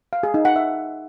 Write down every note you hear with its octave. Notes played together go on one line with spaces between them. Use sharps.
F5
G#4
D#4
F#5
E5